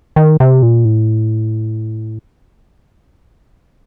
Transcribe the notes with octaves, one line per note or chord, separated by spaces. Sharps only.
D#3
C3
A#2
A2